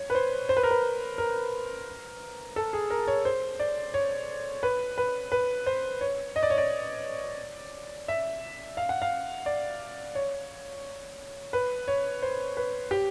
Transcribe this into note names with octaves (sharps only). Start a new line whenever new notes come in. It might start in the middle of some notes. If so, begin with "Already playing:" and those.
Already playing: C#5
B4
C5
C5
B4
A#4
B4
A#4
A4
G#4
A#4
C#5
C5
D5
C#5
B4
B4
B4
C5
C#5
D#5
D5
C#5
D5
E5
F5
F#5
F5
D5
C#5
B4
C#5
C5
B4
G4